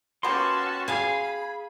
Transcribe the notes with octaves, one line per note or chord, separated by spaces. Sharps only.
A#3 B3 C#4 F#4 G4 A5 C6
G#4 F5 G#5 B5